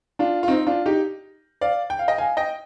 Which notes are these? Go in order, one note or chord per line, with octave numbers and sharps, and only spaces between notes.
D4 F4
F4
C4 D#4
D4 F4
D#4 G4
D5 F5
G5
F5
D#5 G5
F5 G#5
D#5 G5